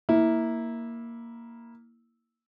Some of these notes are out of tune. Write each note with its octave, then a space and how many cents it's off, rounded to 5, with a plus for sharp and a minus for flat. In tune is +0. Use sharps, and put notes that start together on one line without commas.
A#3 +0 E4 -15